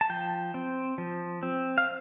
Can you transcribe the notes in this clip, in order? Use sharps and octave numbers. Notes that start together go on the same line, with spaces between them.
A5
F3 G5
C4
F3
C4
F5